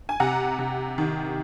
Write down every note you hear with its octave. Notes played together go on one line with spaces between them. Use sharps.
G#5
C3 F#5 A#5
C3
D#3